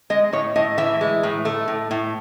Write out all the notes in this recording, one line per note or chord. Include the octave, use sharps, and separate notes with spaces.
G#3 D#5
A2 C#5
A2 D#5
E3 E5
G#3
A2
A3
A2
A2